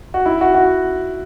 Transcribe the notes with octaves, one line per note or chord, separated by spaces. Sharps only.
F#4
E4
F#4
F#4